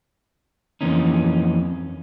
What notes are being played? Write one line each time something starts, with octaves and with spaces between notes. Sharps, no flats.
F2 G#2 E3 A#3 C#4 D#4